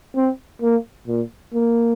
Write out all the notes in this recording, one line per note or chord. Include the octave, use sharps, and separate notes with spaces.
C4
A#3
A#2
A#3